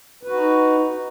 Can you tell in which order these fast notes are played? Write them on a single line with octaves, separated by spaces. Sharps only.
B4 F#4 D#4